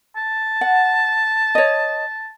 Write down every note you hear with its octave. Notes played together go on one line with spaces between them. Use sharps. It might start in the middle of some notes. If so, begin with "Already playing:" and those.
A5
F#5
C#5 D#5